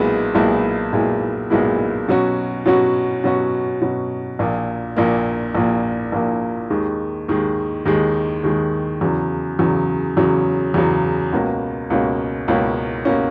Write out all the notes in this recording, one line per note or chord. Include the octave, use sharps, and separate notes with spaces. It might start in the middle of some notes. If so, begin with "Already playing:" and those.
Already playing: B1 A#2 G#3 B3 E4
B1 A#2 G#3 B3 E4
B1 A#2 G#3 B3 E4
B1 A#2 G#3 B3 E4
B2 F#3 C#4 F#4
B2 F#3 C#4 F#4
B2 F#3 C#4 F#4
B2 F#3 C#4 F#4
A#1 A#2 A#3
A#1 A#2 A#3
A#1 A#2 A#3
A#1 A#2 A#3
D#2 D#3 G#3
D#2 D#3 G#3
D#2 D#3 G#3
D#2 D#3 G#3
E2 C#3 F#3
E2 C#3 F#3
E2 C#3 F#3
E2 C#3 F#3
C#2 B2 A#3 C#4
C#2 B2 A#3 C#4
C#2 B2 A#3 C#4
B2 A#3 C#4